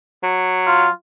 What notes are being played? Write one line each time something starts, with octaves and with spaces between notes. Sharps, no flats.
F#3
F4